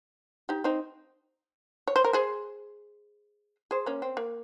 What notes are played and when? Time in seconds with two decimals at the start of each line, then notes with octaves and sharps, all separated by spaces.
0.49 D#4 G4
0.64 C4 D#4
1.88 C#5
1.96 C5
2.05 A#4
2.13 G#4 C5
3.71 G#4 C5
3.86 A#3 C#4
4.02 C4
4.17 A#3